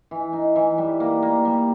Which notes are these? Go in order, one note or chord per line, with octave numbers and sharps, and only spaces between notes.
E3
D#4
E3
G3
A#3
A#3
G3